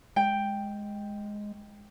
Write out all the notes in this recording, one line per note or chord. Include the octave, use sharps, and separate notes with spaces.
G#3 G5